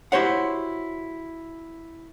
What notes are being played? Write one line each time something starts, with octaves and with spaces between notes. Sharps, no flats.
E4 F#4 G4 C5 C#5 F#5